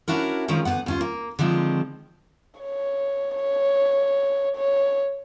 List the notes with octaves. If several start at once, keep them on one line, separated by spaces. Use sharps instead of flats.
C#4 D4 E4 F#4 A#4
D#3 F3 G#3 C#4 A#4
D2 D#3 B3 F#5
D#2 C#4 F4
A#3
D3 D#3 F3 G#3 C4
C#5
C#5
C#5